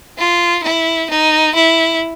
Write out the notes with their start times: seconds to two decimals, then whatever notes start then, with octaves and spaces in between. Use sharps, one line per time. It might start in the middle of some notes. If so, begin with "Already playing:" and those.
0.18 F4
0.64 E4
1.11 D#4
1.56 E4